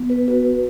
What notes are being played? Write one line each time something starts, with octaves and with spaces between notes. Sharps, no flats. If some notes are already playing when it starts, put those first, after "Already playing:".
Already playing: B3
B4
F#4 B4